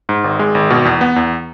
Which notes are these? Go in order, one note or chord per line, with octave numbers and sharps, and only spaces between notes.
G#2
G#1
G#3
G#1
B2
E2
B3
E2